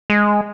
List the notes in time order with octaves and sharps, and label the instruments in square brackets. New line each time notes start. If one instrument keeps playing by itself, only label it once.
[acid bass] G#3